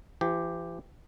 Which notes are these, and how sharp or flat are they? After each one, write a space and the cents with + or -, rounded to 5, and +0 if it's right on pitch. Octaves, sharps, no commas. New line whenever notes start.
E3 +45 G4 +0